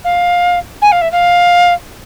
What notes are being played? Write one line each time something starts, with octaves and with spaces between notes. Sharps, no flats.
F5
G#5
F5
E5
F5